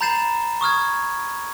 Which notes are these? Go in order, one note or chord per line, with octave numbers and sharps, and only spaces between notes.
A#5 B5 G6 A6 C7 E7
C#6 D#6 F6 G#6